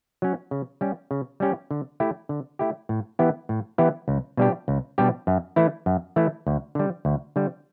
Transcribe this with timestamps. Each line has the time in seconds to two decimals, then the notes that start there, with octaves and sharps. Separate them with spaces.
0.22 F#3 C#4
0.51 C#3
0.81 G3 C#4 G4
1.11 C#3
1.40 G3 C#4 G4
1.71 D3
2.00 A3 E4 G4
2.29 D3
2.59 A3 E4 G4
2.89 A2
3.19 E3 B3 E4 G4
3.49 A2
3.78 E3 B3 E4 G4
4.08 C#2
4.37 B2 G3 D4 G4
4.68 C#2
4.98 B2 G3 D4 G4
5.27 F#2
5.56 E3 A3 E4
5.86 F#2
6.16 E3 A3 E4
6.47 D2
6.75 D3 G3
7.05 D2
7.36 D3 G3